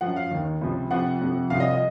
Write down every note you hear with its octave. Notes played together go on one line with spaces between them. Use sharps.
F#2 F3 F#5
F5
D#2 D#3
C#2 C3 F3
F2 C3 F3 F#5
F2 C3 F3
C2 C3 F3 F5
D#5
D#5